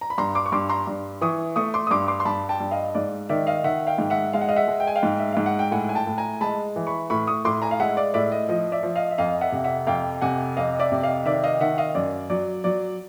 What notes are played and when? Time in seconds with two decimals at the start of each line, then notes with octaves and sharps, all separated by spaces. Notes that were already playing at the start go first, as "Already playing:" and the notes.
0.01 A#5
0.10 B5
0.18 G2 A#5 C6
0.35 C6 D6
0.46 C#6
0.52 G2 C6 D6
0.69 A#5 C6
0.87 G2
1.21 E3 C#6 D#6
1.56 A3 C#6 D#6
1.74 C6 D6
1.87 D#6
1.91 G2 C6 D6
2.08 C6 D6
2.20 C6
2.25 G2 A5 B5
2.49 G5 A5
2.60 G2
2.71 D#5 F5
2.95 G#2 D5
3.29 D#3 D5 E5
3.47 D#5 F5
3.64 D#3 E5 F#5
3.87 F5 G5
3.98 G#2
4.10 E5 F#5
4.33 G#3 F5
4.41 F#5
4.48 D#5 F5
4.56 E5 F#5
4.68 G#3
4.80 G5
4.87 G#5
4.96 F5 G5
5.03 G#2
5.19 E5
5.32 G#2 F5
5.46 F#5
5.59 G5
5.72 A2 F#5 G#5
5.89 G#5
5.95 G5 A5
6.07 A2
6.18 G#5 A#5
6.41 G#3 A5 B5
6.76 E3
6.87 B5 C#6
7.10 A2 B5 C#6
7.27 C#6 D#6
7.45 A2 C6 D6
7.62 G#5 A#5
7.71 F5
7.80 G#3 E5 F#5
7.97 D5
8.14 A2 D5 E5
8.32 D#5
8.49 F3 D#5
8.72 D5 E5
8.83 F3
8.95 D#5 F5
9.11 E5
9.18 F2 D#5 F5
9.41 E5 F#5
9.52 C3
9.64 E5 F#5
9.87 F2 F5 G5
10.21 C3 F#5 G#5
10.57 F2 D#5 F5
10.79 D5 E5
10.92 C3
11.03 D#5 F5
11.26 D#3 D5 E5
11.44 D#5 F5
11.61 D#3 E5 F#5
11.78 D#5 F5
11.95 F#2 D5
12.30 F#3 D5
12.64 F#3 D5